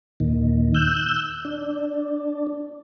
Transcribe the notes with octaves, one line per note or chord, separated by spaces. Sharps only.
D#2 A#2 D#3
E6 F#6 G6
D4